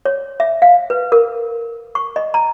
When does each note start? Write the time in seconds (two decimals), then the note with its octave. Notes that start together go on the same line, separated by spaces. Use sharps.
0.05 C#5
0.40 E5
0.62 F5
0.90 B4
1.12 A#4
1.95 C#6
2.16 D#5
2.34 A#5